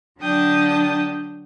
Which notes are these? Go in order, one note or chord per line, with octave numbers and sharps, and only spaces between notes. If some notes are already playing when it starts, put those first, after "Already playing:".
D3 F#3 D4 G5 A5 D#6